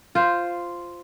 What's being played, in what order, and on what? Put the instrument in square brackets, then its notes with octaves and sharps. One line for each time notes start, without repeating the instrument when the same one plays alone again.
[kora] F4 C5